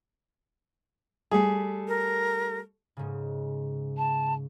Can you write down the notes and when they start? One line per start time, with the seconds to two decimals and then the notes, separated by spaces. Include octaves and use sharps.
1.31 G3 A3 G#4
1.88 A#4
2.97 G#2 C#3
3.98 A5